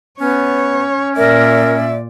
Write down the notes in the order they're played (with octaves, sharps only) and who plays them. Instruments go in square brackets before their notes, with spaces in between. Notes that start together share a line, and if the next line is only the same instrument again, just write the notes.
[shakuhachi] B3 [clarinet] C#4 [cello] C#5
[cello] A#2 D5 [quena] A#4 [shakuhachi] E5